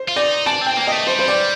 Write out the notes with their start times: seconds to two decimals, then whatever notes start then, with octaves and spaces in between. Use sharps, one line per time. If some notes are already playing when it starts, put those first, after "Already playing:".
Already playing: C5
0.08 F4
0.16 D#4 D5
0.46 D4 A5
0.62 C4 G5
0.77 A#3
0.87 A3 D#5
1.07 G3 C5
1.19 C5
1.28 D5